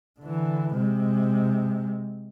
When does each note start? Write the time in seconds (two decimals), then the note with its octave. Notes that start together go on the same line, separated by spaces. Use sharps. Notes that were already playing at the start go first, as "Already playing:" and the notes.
0.20 D3 E3
0.73 C3 G#3